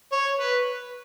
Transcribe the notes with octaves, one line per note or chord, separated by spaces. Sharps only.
C#5
B4